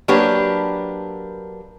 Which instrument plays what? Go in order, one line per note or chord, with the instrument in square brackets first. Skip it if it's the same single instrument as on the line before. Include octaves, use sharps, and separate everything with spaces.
[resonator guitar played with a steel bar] F#3 A#3 D4 G4 A#4 B4